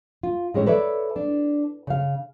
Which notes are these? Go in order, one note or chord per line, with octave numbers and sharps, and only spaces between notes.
F4
A2 G#3 C#4 C#5
A4 B4 C#5 D5 E5
D4
C#3 F5